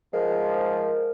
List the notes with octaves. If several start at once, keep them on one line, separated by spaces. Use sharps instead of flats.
G#2 F3 G#3 A#4